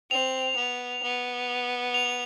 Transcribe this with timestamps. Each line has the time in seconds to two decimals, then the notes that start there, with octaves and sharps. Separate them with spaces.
0.11 C4 F7
0.56 B3
1.03 B3
1.94 F7